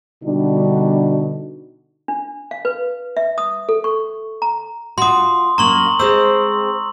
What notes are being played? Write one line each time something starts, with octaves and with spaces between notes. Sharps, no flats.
B2 D3 G3 D4 D#4 F#4
D4
F5
B4
E5
D#6
A4
C#6
A#5
F4 F#4 C6 D#6
F#2 A#3 A#5 C#6 F#7
G#3 C4 C5 E6